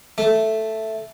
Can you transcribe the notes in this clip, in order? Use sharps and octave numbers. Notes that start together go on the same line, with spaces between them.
A3